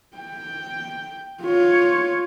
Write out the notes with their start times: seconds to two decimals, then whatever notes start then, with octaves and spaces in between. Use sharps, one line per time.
0.17 G5
1.43 F4 C#5